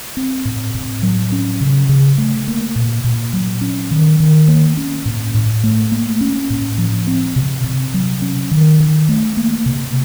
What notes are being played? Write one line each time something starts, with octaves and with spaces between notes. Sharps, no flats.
C4
A2
A2
F#3
C#4
C#3
C#3
A3
A#3
A#2
A#2
F#3
C#4
D#3
D#3
A#3
C#4
A2
A2
A3
A#3
C#4
A2
F3
C4
C3
C3
F#3
C#4
D#3
D#3
A3
A#3
C3